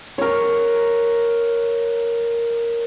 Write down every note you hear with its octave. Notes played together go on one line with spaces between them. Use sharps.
A#4 C#5